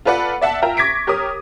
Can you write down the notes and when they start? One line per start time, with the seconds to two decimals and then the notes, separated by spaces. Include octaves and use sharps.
0.05 F4 A4 B4 D5 F#5
0.41 D5 E5 F#5 A5
0.62 F4 A#4 E5 G5 A#5
0.77 C#6 D6 G#6 A#6 B6 D7
1.07 G4 A#4 C#5 D6 D#6